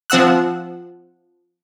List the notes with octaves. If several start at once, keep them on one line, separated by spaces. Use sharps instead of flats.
F3 C4 F#5 E6 F#6